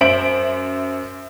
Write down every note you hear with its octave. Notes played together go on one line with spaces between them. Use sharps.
F#2 C5 E5 D7 F#7